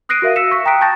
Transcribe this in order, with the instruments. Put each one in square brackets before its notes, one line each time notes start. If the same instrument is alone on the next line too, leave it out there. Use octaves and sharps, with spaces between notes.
[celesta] D#6 F#6 A#6 C7 D7 D#7
F#4 A#4 E5 F5
E6 A#6 B6 C#7 E7
C#6 B6
G5 A#5 D#6 F#6 B6 D7
A5 C#6 G6 A6 A#6